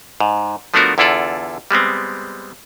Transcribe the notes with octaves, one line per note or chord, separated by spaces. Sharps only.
G#2
F3 A3 B3 D4 F#4 A#4
E2 D3 E4 F4 A4 D5
G3 G#3 B3 C4